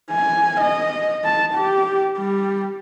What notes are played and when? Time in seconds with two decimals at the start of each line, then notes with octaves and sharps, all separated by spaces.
0.12 G#5
0.60 D#5
1.25 A5
1.54 G4
2.18 G3